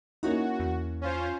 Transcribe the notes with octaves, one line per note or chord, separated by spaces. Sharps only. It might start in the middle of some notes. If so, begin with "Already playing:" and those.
A#3 C#4 D#4 E4 F#4
E2
C#4 F4 C5